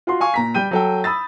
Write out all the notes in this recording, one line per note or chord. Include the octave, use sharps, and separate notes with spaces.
F4 F#4 C6
F5 G#5 C#6
A#2 A#5 B6
G3 G5 G6 D#7
F#3 A4 G5
B5 D#6 E6 A6